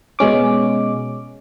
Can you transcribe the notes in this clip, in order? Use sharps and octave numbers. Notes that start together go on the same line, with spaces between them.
B2 G#3 C#4 D6